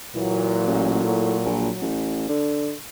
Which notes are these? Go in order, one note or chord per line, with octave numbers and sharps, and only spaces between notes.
A#2 E3 F#3
A1
A2
A#1
A1
D3